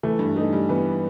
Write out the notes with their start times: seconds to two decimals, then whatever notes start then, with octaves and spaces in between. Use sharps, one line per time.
0.03 E3 A3
0.19 G2
0.36 A3 D#4
0.53 G3
0.69 E3 B3